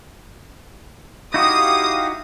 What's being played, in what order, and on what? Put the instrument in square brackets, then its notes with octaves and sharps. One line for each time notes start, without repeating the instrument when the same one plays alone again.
[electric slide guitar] D#4 E4 F#4 [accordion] G4 F5 [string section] D#6